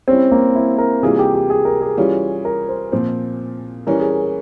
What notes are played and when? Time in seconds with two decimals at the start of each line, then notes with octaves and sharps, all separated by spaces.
0.08 G3 C4 C#4 E4
0.32 A#3
0.55 E4
0.78 A#4
1.02 C3 E3 G3 A#3 F4 G#4
1.19 G4
1.35 G4
1.50 G#4
1.65 A#4
1.81 G#4
1.97 E3 G3 C#4 F4
2.45 A#4
2.69 C5
2.92 A#2 F3 C4 C5
3.87 E3 G3 C#4 A#4
3.99 G#4
4.10 A#4
4.22 A#4